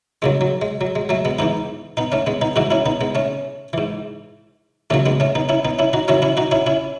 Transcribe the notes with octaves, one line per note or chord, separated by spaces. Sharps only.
D#2 C#3 F#3 G#3
F#3
G#3
F#3
G#3
F#3 A3
G#3 B3
G#2 E3 B3 D#4
B3 D#4
A3 C#4
G#3 B3
B3 D#4
G#2 E3 D#4 F#4
C#4 E4
B3 D#4
G#3 B3
A3 C#4
G#2 E3
D#2 C#3 F#3 A3 C#4
G#3 B3
A3 C#4
B3 D#4
C#4 E4
B3 D#4
C#4 E4
D#4 F#4
F#2 D#3 F#3 C#4 E4
C#4 E4
D#4 F#4
C#4 E4
C#4 E4